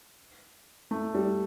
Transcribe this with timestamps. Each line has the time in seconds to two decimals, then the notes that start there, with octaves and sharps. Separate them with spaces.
0.91 A3
1.15 G3